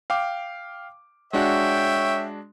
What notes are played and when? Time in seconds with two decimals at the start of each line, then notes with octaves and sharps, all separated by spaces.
0.10 F5 G5 D6
1.33 G#3 D4 F#4 C#5 E5 G5